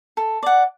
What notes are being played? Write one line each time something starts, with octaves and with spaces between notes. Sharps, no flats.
A4
D5 F#5